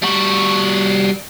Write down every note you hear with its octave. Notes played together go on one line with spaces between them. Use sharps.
G3 F#4